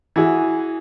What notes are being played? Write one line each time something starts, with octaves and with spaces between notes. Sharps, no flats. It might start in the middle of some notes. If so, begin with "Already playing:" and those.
E3 F#4 G#4